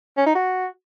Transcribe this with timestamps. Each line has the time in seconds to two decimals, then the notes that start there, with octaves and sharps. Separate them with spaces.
0.17 C#4
0.26 D#4
0.35 F#4